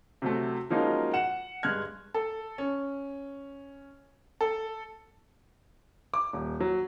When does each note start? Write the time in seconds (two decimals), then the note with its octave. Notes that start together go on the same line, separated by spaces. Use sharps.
0.22 C3 F#3 A3
0.70 F3 F#3 G#3 A#3 C#4 D#4
1.13 F#5 E7
1.63 G2 G#3 F6 F#6 G#6
2.14 A4
2.58 C#4
4.41 A4
6.14 D6
6.33 D#1
6.60 F#3